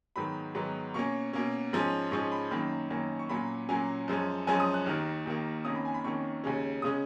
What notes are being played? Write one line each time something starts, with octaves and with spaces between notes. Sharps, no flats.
G#2 D#3 F#3 B3 B5
G#2 D#3 F#3 B3
B2 A#3 C#4 C#6
B2 A#3 C#4
G#2 F3 G#3 C#4
G#2 F3 G#3 C#4 C#6
B5
F#2 D#3 A#3 C#4 B5
F#2 D#3 A#3 C#4
C#6
A#2 F#3 A#3 C#4 B5
A#2 F#3 A#3 C#4 G#5
F#2 F3 G#3 C#4
F#2 F3 G#3 C#4 G#5
D#6
F#6
D#2 D#3 A#3 F6
D#2 D#3 A#3
F2 D#3 A#3 C#4 D#6
B5
G#5
B5
F2 D#3 A#3 C#4 C#6
D#2 C#3 G#3 C#4
C#3 G#3 C#4 D#6